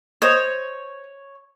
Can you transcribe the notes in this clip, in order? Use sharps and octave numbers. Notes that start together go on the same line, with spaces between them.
C5 C#5 D#5